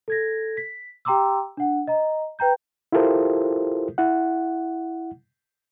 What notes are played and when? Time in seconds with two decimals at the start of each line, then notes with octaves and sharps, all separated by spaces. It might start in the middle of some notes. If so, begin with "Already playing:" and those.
0.08 A4 G#6 A#6
0.57 B6
1.05 G4 G5 A#5 C6 D6 E6
1.57 D4 F#5
1.88 D#5 A#5
2.39 B4 G5 A#5 G6
2.92 E4 F4 G4 A4 A#4 C5
3.98 E4 F#5